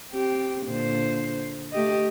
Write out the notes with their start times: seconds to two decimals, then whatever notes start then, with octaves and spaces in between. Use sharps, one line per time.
0.12 C4 G4
0.65 A#2 D3 C5
1.72 A3 G4 D#5